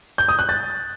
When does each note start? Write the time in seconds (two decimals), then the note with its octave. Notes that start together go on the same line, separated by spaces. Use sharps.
0.18 G6
0.28 D#6
0.39 F#6
0.49 A6